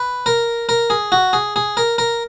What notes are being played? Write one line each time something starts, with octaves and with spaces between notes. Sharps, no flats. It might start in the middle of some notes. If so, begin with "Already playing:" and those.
Already playing: B4
A#4
A#4
G#4
F#4
G#4
G#4
A#4
A#4